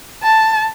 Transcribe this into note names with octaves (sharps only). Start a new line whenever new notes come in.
A5